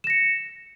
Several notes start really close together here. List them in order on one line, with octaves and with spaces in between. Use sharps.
E7 A#6 C#7